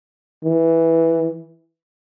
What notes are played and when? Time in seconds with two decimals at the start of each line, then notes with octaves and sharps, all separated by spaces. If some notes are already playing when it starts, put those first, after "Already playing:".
0.44 E3